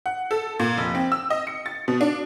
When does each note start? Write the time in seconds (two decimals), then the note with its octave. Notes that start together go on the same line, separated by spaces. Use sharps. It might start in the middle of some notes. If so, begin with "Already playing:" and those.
0.06 F#5
0.31 A4
0.59 A#2
0.78 F1
0.95 C4
1.12 E6
1.30 D#5
1.47 C#7
1.66 A6
1.88 B2
2.01 D4